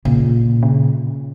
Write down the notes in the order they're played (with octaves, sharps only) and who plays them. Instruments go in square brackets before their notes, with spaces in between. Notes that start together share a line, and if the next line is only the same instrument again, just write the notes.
[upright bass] A#2 [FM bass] C#3
[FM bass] C#3